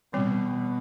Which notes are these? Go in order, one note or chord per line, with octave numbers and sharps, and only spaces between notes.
B2 E3 G3 C4